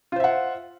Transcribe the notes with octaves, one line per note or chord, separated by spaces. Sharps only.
F4 C5 E5 F#5